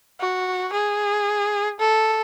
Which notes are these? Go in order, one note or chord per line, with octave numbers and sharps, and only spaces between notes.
F#4
G#4
A4